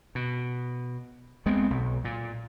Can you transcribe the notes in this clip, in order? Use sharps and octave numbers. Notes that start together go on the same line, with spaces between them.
B2
D2 G#3 B3 C4
B1
A#2